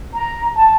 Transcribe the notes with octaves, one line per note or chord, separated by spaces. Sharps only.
A#5
A5